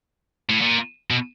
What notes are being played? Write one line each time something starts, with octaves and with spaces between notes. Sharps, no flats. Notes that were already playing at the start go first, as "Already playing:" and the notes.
A2
A#2
B2